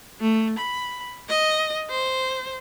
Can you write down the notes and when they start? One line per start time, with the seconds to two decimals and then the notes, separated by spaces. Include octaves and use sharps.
0.20 A3
0.58 B5
1.29 D#5
1.90 C5